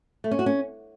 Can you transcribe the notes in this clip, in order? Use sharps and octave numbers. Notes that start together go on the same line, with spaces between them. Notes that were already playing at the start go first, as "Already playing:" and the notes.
A3
C#4
F#4
C#4